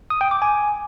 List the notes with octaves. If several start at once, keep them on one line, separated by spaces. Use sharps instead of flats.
D#6
G5
D6
G#5